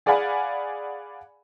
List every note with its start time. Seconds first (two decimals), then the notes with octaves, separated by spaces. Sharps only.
0.06 G#4 D5 F5 F#5 G#5 B5